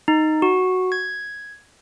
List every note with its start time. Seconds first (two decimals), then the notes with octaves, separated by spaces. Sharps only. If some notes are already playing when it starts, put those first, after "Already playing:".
0.08 D#4
0.42 F#4
0.92 G#6